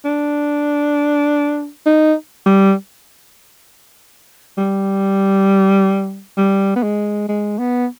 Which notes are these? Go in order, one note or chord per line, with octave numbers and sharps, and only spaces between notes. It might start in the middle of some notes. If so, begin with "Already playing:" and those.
D4
D#4
G3
G3
G3
B3
G#3
G#3
B3